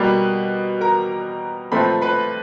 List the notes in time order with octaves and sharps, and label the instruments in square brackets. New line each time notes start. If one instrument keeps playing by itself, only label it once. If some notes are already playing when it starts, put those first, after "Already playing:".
Already playing: [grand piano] B2 G3 A#3 B4 B5
A#4 A#5
A#2 F3 A3 C4 B4 B5
B4 B5